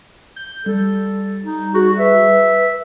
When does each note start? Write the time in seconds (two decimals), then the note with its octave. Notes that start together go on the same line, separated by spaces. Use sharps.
0.36 G6
0.66 G3 A4
1.44 D#4
1.74 F#4 G#4
1.99 B4 E5